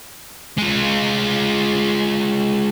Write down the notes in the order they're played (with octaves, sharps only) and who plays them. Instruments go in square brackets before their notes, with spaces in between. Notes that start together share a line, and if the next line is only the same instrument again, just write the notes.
[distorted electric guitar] G#3 F4